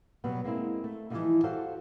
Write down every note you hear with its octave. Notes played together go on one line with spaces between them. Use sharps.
B2 F#3 G3 B3
G#3 A#3 C4 E4
A3
E3 F3 G3 A3 A#3 D#4
F#4 G4 A4 C5 F5